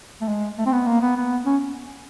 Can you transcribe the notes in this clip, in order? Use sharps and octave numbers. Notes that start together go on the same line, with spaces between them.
A3
G#3
A3
C4
B3
A#3
B3
B3
C#4